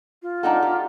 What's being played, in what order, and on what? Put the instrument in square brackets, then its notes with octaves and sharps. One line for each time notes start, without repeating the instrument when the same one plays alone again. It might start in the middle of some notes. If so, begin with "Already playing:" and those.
[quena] F4
[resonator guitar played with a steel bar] D4 D#4 A4 [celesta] F#5 G5 A#5
[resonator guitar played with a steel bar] G4